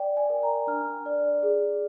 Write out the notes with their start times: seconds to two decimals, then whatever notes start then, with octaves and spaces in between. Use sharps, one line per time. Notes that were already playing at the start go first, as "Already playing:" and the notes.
Already playing: D5 G5
0.17 G#5
0.30 A#4
0.43 A#5
0.67 D4 F6
1.06 D5
1.43 G#4